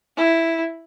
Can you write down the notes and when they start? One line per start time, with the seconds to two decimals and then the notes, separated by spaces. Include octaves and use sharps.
0.17 E4